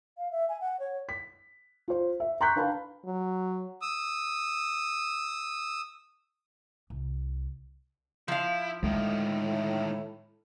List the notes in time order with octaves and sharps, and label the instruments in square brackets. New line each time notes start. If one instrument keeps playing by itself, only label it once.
[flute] F5
E5
G#5
F#5
C#5
[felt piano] B6
F4 C5
E5
A#5 C6 C#6 F#6 G6 B6
D4 B4 F5 G5 A5 B5
[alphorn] F#3
[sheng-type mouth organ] D#6 E6
[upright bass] C2
[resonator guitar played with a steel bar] F3 F5 [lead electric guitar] E4
[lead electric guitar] D2 D#3 [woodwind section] A2 [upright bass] G#3